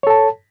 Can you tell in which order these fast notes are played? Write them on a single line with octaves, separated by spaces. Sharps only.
C#5 A4 A5